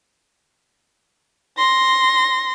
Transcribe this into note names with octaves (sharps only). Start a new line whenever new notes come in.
C6 A#6